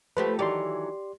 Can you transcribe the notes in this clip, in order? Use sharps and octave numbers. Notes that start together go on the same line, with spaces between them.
F3 A3 G4 B4 C5 B5
D#3 E3 F#3 G4 D5 C6